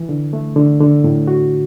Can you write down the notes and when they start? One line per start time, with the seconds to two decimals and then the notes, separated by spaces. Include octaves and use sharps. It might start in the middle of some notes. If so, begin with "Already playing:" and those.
Already playing: E3
0.09 D3
0.33 A3
0.56 D3
0.80 D3
1.04 A2
1.28 F#4